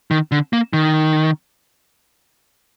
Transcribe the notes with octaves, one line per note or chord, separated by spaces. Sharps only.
D#3
D3
A#3
D#3